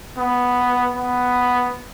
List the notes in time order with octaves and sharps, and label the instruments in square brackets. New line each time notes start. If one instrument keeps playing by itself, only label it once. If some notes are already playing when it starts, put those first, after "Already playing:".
[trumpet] B3
B3